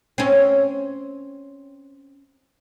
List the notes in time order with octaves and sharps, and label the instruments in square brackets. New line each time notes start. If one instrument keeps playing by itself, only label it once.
[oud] C4 C#4